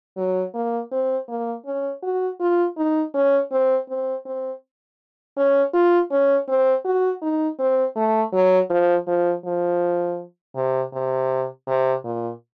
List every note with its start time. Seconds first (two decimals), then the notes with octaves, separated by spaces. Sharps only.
0.17 F#3
0.54 A#3
0.92 C4
1.29 A#3
1.66 C#4
2.03 F#4
2.40 F4
2.77 D#4
3.14 C#4
3.52 C4
3.89 C4
4.26 C4
5.37 C#4
5.74 F4
6.11 C#4
6.48 C4
6.85 F#4
7.22 D#4
7.59 C4
7.96 A3
8.33 F#3
8.70 F3
9.07 F3
9.45 F3
10.56 C3
10.93 C3
11.67 C3
12.04 A#2